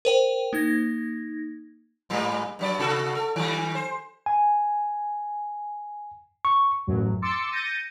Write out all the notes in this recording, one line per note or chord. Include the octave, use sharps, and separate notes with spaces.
A#4 C5 G5
A#3 D#4 G#6 A#6
G#2 G3 A#3
G2 F#3 D5
C3 F#4 A4
A4
D#3 G3
C5
G#5
C#6
A1 F#2 F#3
C6 D6 E6 A6 C#7
G6 A6 A#6 C#7 D#7